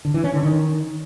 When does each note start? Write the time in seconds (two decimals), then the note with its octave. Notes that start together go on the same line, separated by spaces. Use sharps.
0.05 D3
0.14 E3
0.24 C#4
0.33 D3
0.43 D#3